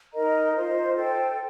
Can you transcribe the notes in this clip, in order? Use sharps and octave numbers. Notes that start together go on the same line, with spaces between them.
D#4 A#4 D#5 A#5
F4 C5 D#5
A4 C5 G5